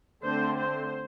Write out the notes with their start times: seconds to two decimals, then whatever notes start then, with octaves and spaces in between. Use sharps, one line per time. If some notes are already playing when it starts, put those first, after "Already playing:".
0.24 D3 A3 C4 C5
0.57 C5